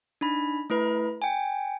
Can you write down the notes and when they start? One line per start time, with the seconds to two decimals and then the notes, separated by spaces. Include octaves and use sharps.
0.21 D4 D#4 B5
0.70 A3 E4 B4 B5
1.22 G5 G#5